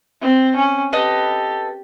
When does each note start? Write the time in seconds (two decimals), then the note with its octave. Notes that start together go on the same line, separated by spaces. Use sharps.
0.22 C4
0.56 C#4
0.93 G4 A4 B4 D#5